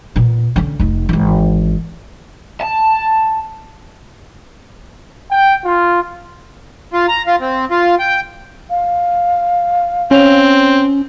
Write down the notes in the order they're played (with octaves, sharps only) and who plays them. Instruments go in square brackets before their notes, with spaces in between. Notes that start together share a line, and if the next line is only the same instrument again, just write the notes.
[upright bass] A#2 B3
D3 C#4
F1 D#4
G#1 E3
[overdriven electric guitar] A5
[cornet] G5
F4
[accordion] F4
A#5
F4
C4
F4
G5
[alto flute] F5
[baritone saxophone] C4 [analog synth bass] C#4 [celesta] C#5 F7